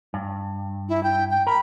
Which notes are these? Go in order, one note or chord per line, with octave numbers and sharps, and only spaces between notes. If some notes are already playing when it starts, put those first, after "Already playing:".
G2
E4
G5
G5
A#4 B5